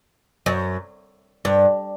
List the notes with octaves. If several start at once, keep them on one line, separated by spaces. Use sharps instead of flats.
F#2
G2